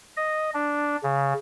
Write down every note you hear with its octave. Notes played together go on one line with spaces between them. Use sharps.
D#5
D4
C#3